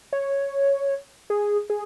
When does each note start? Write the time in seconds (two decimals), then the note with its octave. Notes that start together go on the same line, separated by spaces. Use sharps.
0.13 C#5
1.30 G#4
1.70 G#4